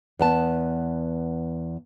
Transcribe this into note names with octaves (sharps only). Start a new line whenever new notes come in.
E2 B3 A5